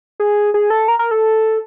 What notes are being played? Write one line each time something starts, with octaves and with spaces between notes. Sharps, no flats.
G#4
G#4
A4
A#4
A#4
A4